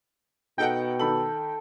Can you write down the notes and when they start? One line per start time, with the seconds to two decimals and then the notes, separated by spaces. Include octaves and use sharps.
0.58 B2 D#4 A4 F#5 G5
0.99 D#3 A4 B5 F#7